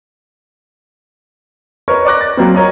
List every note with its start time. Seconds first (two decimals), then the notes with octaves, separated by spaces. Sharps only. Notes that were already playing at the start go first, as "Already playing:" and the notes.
1.88 A#4 B4 C#5 D#5 C#6
2.05 D5 D6 F#6 A#6
2.21 A6
2.37 F#3 A#3 C4
2.55 A#4 C#5 D#5 A#5